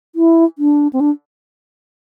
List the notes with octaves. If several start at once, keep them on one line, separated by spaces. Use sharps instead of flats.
E4
D4
C4
D4